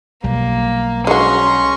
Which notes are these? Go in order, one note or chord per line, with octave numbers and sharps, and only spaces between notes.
B1 G3 A#3
G#3 C#4 F#4 A#5 C6 C#6